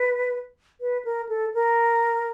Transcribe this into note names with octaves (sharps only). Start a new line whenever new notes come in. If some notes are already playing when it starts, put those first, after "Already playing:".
Already playing: B4
B4
A#4
A4
A#4